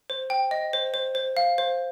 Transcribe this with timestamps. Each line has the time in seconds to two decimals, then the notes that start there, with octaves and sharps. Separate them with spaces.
0.10 C5
0.30 G5
0.51 D#5
0.73 C5
0.94 C5
1.15 C5
1.37 F5
1.58 C5